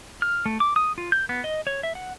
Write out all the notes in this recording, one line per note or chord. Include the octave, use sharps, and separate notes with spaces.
F6
A3
D6
D#6
F4
G6
B3
D#5
C#5
E5
F#5